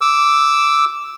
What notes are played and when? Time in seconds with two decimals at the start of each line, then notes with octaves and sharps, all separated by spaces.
0.01 D6 E6